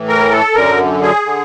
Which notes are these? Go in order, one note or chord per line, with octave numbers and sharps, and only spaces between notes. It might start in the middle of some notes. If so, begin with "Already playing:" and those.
Already playing: A2 E3
A#4
A4
F#2 D3 A#4
G#4
D3